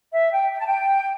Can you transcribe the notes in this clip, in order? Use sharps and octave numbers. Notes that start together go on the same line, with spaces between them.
E5
G5
G5
A5
G5